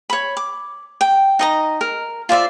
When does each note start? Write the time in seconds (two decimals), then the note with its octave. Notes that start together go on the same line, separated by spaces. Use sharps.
0.10 C#5 B5
0.37 D6
1.01 G5
1.39 D#4 D#5 A#5
1.81 A#4
2.29 F4 C5 D5 E5